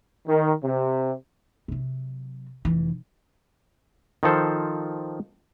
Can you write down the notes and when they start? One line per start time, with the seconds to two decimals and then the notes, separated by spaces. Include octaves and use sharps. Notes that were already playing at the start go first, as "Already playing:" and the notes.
0.28 D#3
0.64 C3
1.68 C3 F#3
2.65 F1 E3
4.23 D#3 F3 A4 C5